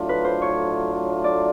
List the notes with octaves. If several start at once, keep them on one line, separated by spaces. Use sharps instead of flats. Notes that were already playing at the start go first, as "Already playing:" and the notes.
Already playing: A2 F#3 A3 D4 F4
B4
C5
C#5
D5